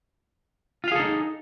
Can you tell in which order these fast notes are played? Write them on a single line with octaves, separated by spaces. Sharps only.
F4 F5 G#4 A4 D#4